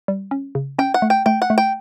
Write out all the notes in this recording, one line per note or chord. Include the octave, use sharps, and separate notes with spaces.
G3
C#4
C#3
C#4 G5
F#5
A3
G5
A3 G5
F#5
A3
G5